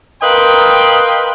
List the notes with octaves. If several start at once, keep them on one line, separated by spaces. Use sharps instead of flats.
A#4 B4 D#5 F5 G5 C6